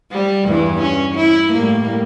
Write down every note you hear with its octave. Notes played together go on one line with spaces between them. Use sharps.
G3
E2 G2 E3
C#4
E4
A2 G3 A#3